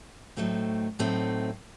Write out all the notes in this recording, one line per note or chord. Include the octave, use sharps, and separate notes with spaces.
A2 F#3 A3 C4 D#4
A2 F#3 A3 C4 D#4